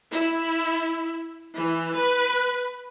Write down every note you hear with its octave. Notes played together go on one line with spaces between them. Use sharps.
E4
E3
B4